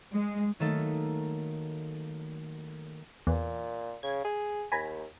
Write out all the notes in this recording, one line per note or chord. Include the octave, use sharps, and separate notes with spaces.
G#3
D#3 F#3 A3 A#3 D#4 A4
E2 A#2
C#3 G#6
G#4
D#2 G#5 A#5 B5